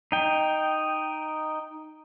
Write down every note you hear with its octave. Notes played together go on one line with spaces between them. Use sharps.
D#4 G5